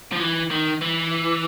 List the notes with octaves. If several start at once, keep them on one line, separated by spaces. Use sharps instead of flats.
F3
E3
D#3
E3